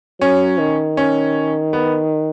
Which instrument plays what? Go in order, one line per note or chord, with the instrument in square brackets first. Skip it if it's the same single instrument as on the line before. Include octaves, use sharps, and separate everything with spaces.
[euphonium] F#3 [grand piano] C#4
[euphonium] D#3
[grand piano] C#4
B3